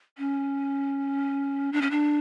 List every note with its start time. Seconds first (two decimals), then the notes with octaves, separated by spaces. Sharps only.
0.18 C#4
1.73 D4
1.82 C#4
1.91 D4